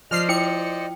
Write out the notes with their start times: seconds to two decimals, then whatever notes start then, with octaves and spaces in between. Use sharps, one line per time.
0.11 F3 C5 D5 D#5 F6 C7
0.29 E4 G5 C#7